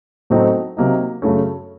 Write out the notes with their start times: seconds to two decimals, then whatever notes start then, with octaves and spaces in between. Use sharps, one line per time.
0.30 A2 F#3 A3 C4 D#4
0.77 C3 F#3 A#3 D#4
1.22 F#2 C#3 A3 C#4